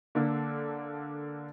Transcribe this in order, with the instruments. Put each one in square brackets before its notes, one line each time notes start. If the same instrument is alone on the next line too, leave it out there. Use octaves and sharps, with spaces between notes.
[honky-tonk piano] D3 A#3 D4 A4